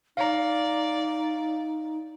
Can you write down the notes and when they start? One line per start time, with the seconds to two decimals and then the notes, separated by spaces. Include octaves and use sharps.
0.17 D#4 D5 F5 A#5